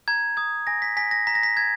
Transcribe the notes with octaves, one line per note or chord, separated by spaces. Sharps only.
A#5 G#6
D#6 G#6
G#5 A#6
B6
G#5 B6
A#6
A#5 B6
A#6
B6
A#5 G#6